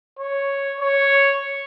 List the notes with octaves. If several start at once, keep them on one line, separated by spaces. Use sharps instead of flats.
C#5
C#5